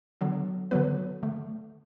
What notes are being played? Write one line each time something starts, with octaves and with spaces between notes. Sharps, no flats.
D3 F#3 B3
D3 F#3 B3 B4
D3 A3